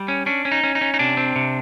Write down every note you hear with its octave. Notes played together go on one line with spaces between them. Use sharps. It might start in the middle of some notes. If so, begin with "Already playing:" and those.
Already playing: G3
C#4
C#4 D4
C#4
D#4
C#4
D#4
C#4
D#4
C3 D4
C4
C3